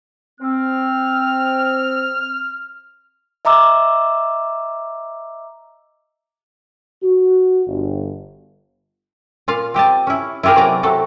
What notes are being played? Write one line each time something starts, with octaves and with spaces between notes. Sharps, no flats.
C4 F6
D#5 E5 A#5 D6 E6
F#4
G1
A#2 F4 F5
C4 G4 D#5 A5
C#4 E4
E4 F4 G4 G#4 A#4
C3 F#3 A#3 B4 D5 A#5
C3 F#3 A3 A4